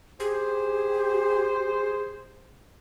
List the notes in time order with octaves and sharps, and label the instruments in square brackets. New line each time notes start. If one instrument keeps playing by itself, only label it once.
[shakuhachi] G4 [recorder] G#4 [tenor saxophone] C5